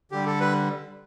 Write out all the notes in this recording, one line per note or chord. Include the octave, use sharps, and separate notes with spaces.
D3 G3 G4
A4
B4